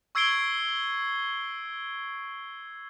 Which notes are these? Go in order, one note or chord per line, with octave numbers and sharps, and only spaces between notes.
C#6 E6 G#6 C7 D7 G7